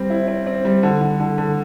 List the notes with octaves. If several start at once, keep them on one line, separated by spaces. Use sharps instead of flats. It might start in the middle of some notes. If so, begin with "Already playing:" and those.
Already playing: G3 C4
E4
C4
C4
G3
D3
D3
D3
D3